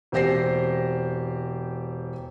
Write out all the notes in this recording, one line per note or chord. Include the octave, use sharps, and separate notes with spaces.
E1 C4 G4 C5 A#6 C7